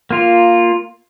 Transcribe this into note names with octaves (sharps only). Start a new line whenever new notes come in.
A#3 F4